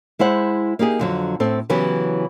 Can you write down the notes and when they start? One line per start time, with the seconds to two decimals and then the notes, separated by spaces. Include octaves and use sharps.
0.19 G#3 E4 C5 F#5
0.79 A#3 D#4 G4 G#4
0.99 F2 D3 F#3
1.40 A2 C4 A4
1.69 C#3 E3 F#3 B3 G4